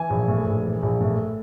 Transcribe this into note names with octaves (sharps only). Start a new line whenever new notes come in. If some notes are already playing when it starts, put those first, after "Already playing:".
Already playing: E3 G#5
A#1
A2
A#1
E3
A#1
A2